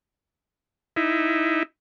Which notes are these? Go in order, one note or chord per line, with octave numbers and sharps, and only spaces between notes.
D#4 E4